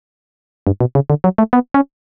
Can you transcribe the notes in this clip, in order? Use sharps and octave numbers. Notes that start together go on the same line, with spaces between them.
G2
B2
C#3
D3
F#3
A3
B3
C#4